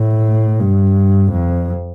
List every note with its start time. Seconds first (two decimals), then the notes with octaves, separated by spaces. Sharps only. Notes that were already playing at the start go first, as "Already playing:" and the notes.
Already playing: A2
0.59 G2
1.32 F2